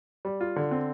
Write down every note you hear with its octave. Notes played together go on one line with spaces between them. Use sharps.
G3
F4
D3
C4